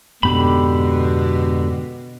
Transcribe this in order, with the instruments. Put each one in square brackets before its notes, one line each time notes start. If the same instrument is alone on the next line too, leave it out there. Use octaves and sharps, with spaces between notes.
[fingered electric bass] F2 G#2 B3 [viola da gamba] B2 [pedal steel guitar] D3 G4 B5